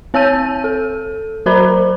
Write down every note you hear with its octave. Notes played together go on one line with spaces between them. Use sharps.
C4 C#5 A5 E6 G6 D#7
A4
F#3 F#4 A#4 C5 A#5 B5